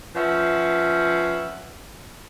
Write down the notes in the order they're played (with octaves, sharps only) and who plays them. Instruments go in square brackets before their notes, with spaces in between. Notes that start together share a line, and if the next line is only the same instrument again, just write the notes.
[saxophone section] F3 C#4 B4 E5 F#5